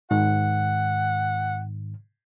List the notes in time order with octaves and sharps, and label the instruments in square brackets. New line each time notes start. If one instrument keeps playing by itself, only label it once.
[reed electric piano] G#2 D#3 [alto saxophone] F#5